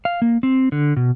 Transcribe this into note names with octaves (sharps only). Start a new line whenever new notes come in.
F5
A#3
C4
D3
B2